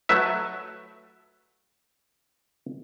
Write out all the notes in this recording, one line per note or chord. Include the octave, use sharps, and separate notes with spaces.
F#3 A3 B4 E5